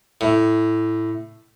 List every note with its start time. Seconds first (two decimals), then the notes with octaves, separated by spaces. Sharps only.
0.21 A2